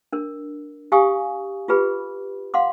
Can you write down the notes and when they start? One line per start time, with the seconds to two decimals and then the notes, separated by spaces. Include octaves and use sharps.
0.13 D4 A#4
0.92 G4 F5 G#5 C#6 D#6
1.68 F4 G4 G#4 B4 B5
2.54 F5 F#5 C6 D6